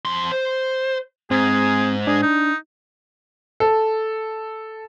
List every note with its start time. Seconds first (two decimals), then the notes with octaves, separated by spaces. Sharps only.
0.05 F2 C6
0.32 C5
1.31 G#2 C4 G#4
2.07 D4 G#4
2.22 D#4
3.60 A4